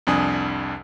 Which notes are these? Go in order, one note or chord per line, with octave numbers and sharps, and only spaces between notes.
C2 F2 D4 G#5 D#6